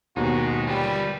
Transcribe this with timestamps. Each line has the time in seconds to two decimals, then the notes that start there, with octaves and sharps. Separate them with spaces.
0.16 D#2 B2 D#4 F#4 G#4
0.67 G3 F4 B4